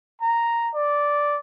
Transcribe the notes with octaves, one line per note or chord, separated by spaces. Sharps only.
A#5
D5